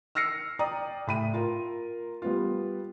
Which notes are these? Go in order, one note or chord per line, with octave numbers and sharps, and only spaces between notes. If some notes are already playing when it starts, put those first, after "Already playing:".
E6 F6 A#6 C7 C#7
D5 G5 A#5 D#6
A2 B5 D#7
F4 A#4
G3 B3 F4